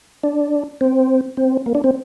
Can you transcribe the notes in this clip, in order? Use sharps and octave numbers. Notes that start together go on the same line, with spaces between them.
D4
C4
C4
A#3
D4
C4